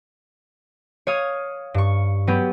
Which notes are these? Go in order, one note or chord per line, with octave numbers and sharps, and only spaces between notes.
C#5 F5 D#6 G#6
G2 C#6
F#3 B3 G4